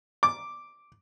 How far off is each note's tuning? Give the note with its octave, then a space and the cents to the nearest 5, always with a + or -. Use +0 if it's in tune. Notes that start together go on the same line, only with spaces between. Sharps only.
D6 +0